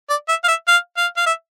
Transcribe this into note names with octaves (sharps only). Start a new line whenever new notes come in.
D5
E5
F5
E5
F5
F5
F5
E5